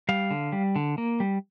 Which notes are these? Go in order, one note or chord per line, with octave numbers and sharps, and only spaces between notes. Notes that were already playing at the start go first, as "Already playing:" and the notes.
G3 F5
D3
G3
D3
A#3
G3